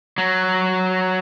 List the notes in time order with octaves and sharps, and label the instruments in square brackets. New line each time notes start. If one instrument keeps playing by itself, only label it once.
[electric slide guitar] F#3